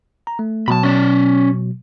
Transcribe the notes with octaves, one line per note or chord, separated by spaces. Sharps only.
A#5
A3
B2 F#3 A5 B5
C#4 D5